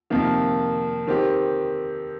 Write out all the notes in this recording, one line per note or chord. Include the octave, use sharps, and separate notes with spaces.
F2 C3 D#3 A#3
D#3 C4 G4